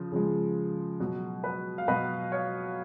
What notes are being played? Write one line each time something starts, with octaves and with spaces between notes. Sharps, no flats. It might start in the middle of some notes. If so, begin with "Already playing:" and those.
Already playing: C#3 F3
C#3 F3 G#3
B2 F#3
B4
F5
B2 F#3 B4 D#5
C#5 F5